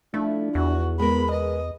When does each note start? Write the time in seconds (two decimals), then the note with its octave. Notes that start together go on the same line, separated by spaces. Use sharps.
0.14 F3 A3 D4 E4
0.55 E2 F#4
0.99 G#3 B3 A#4 B5
1.31 B4 D#5